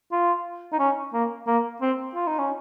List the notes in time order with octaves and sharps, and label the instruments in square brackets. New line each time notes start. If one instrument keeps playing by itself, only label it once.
[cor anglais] F4
D#4
C#4
A#3
A#3
C4
F4
D#4
C#4